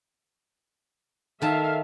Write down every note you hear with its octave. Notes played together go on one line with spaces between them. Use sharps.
D#3 A4 E5 F5 A5